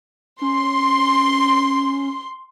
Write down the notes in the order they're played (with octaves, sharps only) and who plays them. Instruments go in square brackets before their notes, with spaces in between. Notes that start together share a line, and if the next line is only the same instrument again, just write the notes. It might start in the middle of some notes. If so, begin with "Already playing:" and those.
[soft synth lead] C#4 [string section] C6